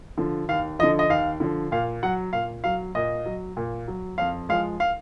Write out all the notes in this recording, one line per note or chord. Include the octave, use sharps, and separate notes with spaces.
D3 F3
D#2 F5
D3 F3 D#5
D#5
D#2 F5
D3 F3
A#2 F5
F#3 F#5
A#2 F5
F#3 F5
A#2 D#5
F#3
A#2
F#3
F2 F5
F3 G#3 F5
F5